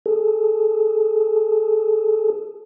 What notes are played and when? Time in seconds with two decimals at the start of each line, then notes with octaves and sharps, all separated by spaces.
0.06 G#4 A4